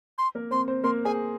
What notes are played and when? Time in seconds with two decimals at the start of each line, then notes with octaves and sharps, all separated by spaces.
0.18 C6
0.35 A#3 A#4
0.51 C4 C5 C6
0.68 C4 C5
0.84 A#3 A#4 C6
1.05 G#4 G#5